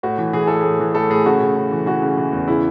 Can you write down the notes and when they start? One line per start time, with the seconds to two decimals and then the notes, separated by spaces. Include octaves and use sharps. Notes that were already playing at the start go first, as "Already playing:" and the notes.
0.03 A2 F#4
0.18 E3
0.33 E3 G#4
0.47 A2 A4
0.61 A2 G#4
0.80 E3
0.94 A2 A4
1.10 A2 G#4
1.25 C#3 F#4
1.41 C#3
1.56 C#3
1.71 E3
1.86 E3 F#4
2.02 C#3
2.17 E3
2.33 E2
2.48 C#3 E4